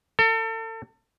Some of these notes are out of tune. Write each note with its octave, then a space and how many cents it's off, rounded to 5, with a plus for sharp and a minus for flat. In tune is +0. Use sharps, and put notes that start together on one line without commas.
A4 +35